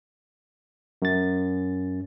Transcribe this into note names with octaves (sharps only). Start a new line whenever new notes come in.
F#2 A6